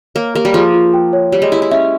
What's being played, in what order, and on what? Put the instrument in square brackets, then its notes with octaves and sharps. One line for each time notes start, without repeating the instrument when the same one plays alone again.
[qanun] A#3 [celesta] C#5
[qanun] A#3 [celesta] G4
[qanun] G3
[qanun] F3 [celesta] G#4
[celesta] F4
G5
C#5
[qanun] G3 [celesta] C#5
[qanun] G#3
[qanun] E4 [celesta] G4
[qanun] E4
[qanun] C#4 [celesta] E5